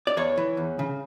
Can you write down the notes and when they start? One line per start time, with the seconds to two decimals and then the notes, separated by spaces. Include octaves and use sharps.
0.07 D5
0.17 E2 C#5
0.37 E3
0.57 E2
0.79 C#3